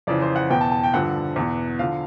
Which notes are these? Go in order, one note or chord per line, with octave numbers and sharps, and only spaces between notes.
F2 C#3 E3 D5
C5
F#5
E2 B2 G5
A5
A5
G5
G2 D3 F3 F#5
E2 B2
D3 F3 F5